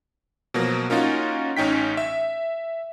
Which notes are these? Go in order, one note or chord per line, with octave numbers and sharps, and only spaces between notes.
B2 F3 F#3 A#3
A#3 C#4 D#4 F4 F#4
A1 C#4 D#4 G5 B6
E5